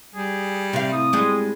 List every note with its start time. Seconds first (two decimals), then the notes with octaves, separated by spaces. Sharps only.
0.15 G3 G#4
0.73 C3 F5
0.93 A2 D#6
1.13 A2 G3 G#3